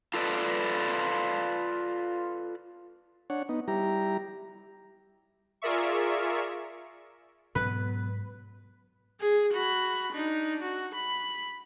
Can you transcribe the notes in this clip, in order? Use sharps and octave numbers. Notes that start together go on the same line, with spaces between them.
F4 A4 B4 D5
D4 C#5 F#5
B3 D#4
G3 E4 G4 A#5
F4 G#4 A#4 D5 E5 C#6
G#2 B2 F#3 B3 B4
G#4
F#4 B5
D4 D#4
F#4
B5